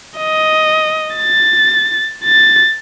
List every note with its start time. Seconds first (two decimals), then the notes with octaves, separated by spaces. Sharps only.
0.18 D#5
1.16 A6
2.25 A6